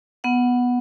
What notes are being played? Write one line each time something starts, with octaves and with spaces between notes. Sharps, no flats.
B3 F#5